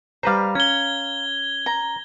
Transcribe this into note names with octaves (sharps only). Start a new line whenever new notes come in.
G3 B4 C5 F5 A#5
C#4 G#6 G7
A#5